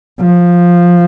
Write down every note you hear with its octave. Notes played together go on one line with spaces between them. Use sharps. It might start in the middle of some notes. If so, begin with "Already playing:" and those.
F3